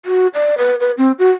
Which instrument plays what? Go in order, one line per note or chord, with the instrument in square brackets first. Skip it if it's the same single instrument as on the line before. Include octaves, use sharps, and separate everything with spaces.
[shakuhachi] F#4
D5
B4
B4
C4
F#4